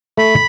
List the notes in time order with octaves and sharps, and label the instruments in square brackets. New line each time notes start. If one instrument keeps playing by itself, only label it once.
[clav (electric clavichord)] A3 [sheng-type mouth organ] B5